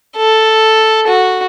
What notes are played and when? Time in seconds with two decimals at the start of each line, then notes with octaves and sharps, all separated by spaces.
0.16 A4
1.07 F#4